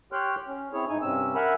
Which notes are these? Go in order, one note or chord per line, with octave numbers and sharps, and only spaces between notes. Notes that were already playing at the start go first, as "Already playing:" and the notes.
G4 C#5 G5 C6 F6 F#6
C#4
C4 E4 G#4 C#5
G#2 D#4 G#5
G2 C3 C4 C#4 E6
A#4 E5 F#5 G#5 A#5 B5